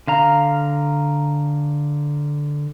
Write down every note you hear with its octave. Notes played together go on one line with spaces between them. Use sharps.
D3 F5 A#5